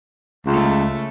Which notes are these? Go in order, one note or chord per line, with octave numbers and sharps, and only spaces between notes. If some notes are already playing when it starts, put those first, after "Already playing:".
C#2 C#3 A3